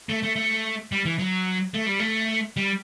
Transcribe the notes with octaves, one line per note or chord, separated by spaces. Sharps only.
A3
A3
A3
G3
E3
F#3
A3
G3
A3
G3